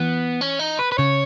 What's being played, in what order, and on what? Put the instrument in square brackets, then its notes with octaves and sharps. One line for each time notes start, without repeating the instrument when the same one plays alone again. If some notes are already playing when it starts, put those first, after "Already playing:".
Already playing: [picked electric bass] E3 [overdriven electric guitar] B3
[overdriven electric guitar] C#4
D#4
B4
B4
[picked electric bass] C#3 [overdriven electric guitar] C#5